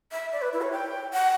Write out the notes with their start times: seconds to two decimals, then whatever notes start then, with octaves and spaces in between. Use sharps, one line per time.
0.12 E5
0.32 D5
0.42 B4
0.53 E4
0.62 C#5
0.72 G5
1.13 F#5